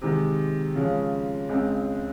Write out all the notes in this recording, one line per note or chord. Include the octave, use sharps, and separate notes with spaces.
C3 D#3 G#3
C#3 F3 G#3 C#4
C#2 C#3 G#3 C4